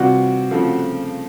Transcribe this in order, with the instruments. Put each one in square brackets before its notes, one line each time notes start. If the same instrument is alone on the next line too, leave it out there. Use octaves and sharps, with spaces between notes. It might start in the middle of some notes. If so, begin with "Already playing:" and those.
Already playing: [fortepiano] C3 E3 G3 C4 F4 [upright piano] F#4
[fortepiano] C#3 F3 A3 C4